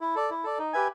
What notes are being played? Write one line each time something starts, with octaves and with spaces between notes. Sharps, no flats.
E4
A4 D5
E4
A4 D5
D#4
G4 B4 E5 G#5